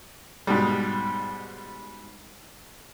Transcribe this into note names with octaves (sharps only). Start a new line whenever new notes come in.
G#2 B2 G3